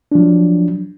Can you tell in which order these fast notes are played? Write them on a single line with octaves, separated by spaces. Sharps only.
D4 F3 F#3